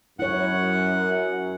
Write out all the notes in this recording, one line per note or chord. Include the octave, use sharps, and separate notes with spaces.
F#2 E4 C#5 F#5